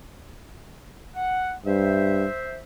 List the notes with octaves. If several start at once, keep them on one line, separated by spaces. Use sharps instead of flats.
F#5
G2 C5 E5